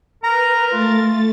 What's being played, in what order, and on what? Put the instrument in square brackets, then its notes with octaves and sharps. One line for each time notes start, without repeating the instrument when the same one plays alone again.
[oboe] A#4 [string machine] B4 [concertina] A#5
[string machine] A3 A6 [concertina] F4